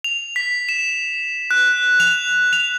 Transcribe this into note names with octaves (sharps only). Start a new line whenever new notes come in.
F7
B6
E7
F#6
F7
F7